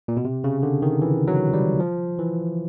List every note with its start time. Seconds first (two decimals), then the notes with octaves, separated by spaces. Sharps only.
0.08 A#2
0.17 B2
0.25 C3
0.44 C#3
0.63 D3
0.82 D#3
1.02 E3
1.28 F#3
1.53 G3
1.80 F3
2.19 E3